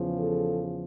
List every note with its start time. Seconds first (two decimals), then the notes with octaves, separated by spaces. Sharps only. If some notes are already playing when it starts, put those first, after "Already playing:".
Already playing: E2 C#3 F3
0.18 A4